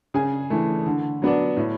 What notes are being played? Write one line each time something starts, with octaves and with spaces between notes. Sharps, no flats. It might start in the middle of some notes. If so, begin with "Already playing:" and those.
C#3 G#4 G#5
E3 A3
D3
F#3 B3 D4
A2